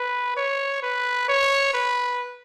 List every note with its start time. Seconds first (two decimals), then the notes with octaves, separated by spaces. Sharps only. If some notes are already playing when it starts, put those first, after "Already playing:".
Already playing: B4
0.37 C#5
0.82 B4
1.28 C#5
1.74 B4